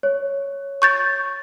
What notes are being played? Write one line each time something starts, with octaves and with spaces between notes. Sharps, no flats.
C#5
C#6 G6 A6